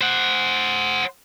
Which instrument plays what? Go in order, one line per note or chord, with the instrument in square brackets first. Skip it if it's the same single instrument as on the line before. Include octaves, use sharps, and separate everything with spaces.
[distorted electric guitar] C5 F#5